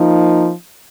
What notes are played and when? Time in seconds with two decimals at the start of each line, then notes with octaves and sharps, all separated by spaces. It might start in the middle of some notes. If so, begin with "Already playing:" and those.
Already playing: F3 A#3 D#4